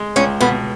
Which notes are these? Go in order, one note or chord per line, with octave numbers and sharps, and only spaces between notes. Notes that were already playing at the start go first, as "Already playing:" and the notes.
Already playing: G#3
C#2 C#4
B2 B3